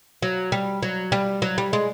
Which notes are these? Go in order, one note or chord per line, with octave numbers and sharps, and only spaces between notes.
F#3
G3
F#3
G3
F#3
G3
G#3